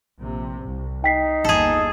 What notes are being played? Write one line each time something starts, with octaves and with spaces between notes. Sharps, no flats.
A#1 C3
C2
D#4 G5 B6 C7
G1 D#2 G#4 A4